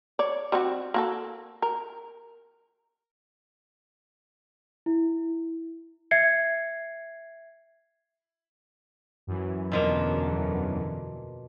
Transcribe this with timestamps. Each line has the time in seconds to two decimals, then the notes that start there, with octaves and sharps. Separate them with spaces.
0.19 C#5 D5
0.52 G3 C4 F#4
0.94 A#3 F#4 A4
1.62 A#4
4.86 E4
6.11 E5 G#6 C7 C#7
9.27 F#2 E3
9.72 E2 B2 D3 F3 A#3